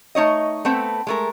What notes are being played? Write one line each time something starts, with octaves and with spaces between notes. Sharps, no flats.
A3 D#4 C#5 D#5
A3 B3 C4
G#3 A3 A#4